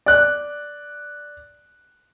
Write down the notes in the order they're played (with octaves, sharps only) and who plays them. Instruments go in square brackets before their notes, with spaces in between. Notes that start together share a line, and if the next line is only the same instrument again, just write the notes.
[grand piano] D5 F#6